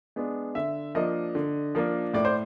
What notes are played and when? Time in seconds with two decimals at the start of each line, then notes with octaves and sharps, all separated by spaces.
0.16 G#3 B3 D4
0.55 D3 E5
0.95 F3 A#3 D4 D#5
1.35 D3
1.75 F3 A#3 D4
2.14 A2 D5
2.25 C5